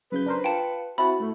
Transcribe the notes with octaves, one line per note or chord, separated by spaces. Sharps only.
F#2 C#3 B4 G6
D4 A#4 C5
F4 G5 A5 C#7
C4 E4 F#4 A5 B5
A2 A3